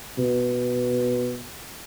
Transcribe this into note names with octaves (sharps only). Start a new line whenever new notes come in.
B2